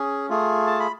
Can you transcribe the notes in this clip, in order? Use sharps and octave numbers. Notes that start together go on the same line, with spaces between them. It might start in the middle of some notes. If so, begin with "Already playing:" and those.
Already playing: C#4 G#4
A3 F4 G#4
A5
B5